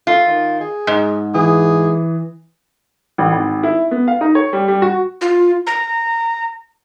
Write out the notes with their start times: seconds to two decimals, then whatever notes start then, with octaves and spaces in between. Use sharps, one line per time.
0.07 A3 F4
0.27 D#3
0.61 G#4
0.87 G#2
1.34 E3 G#4 D#6
3.18 A1
3.32 G#1
3.63 E4
3.91 B3
4.07 F5
4.21 D#4
4.35 C#5
4.53 G3
4.68 G3
4.82 F#4
5.21 F4
5.67 A#5